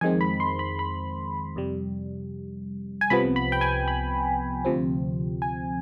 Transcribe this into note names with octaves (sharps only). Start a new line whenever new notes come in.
F2 D#3 G#3 C4 G#5
B5
C6
B5
B5
F2 C3 G3
G#5
C2 C3 F3 B3 B5
B5
G5
G#5
B5
D2 C3 F3 C4
G#5